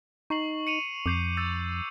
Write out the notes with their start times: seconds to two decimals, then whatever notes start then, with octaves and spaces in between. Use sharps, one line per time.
0.30 D#4 C#6 C7 F#7
0.67 C#7 D#7 F7
1.06 F2 D6 G6 C7
1.37 E6 G6 A6